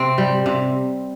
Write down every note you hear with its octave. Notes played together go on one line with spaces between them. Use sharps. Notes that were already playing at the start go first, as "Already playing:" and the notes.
Already playing: C3 C4
G3
C3